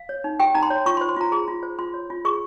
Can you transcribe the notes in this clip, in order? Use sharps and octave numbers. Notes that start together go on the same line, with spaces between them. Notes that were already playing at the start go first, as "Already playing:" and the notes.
Already playing: F5
C#5
D#4
G4 G5
D#4 A#5
C6
C#5
F4 C#6
C6
C5
C6
F4 A#5
G#4 C6
F4
C5
F4 C6
C#5
F4
G#4 C#6